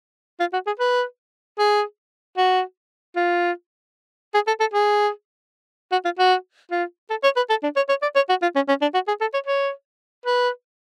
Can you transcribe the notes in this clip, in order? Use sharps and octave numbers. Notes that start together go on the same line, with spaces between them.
F4
F#4
G#4
B4
G#4
F#4
F4
G#4
A4
A4
G#4
F#4
F4
F#4
F4
A4
C#5
B4
A4
D4
C#5
C#5
D5
C#5
F#4
F4
C#4
C#4
D4
F#4
G#4
A4
C#5
C#5
B4